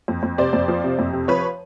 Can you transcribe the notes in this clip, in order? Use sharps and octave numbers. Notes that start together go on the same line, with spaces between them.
F2
F2
C3 C5 D5
F2
F3
C3
F2
C3
F3 B4 C#5